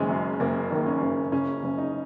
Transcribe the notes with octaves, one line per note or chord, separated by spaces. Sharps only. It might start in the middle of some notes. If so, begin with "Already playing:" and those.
Already playing: F#1 D#3 G#3 C#4
F#2
F#1 A#3
D#3 A#3
C#4
F#1
C#3 C#4
F#1
D#4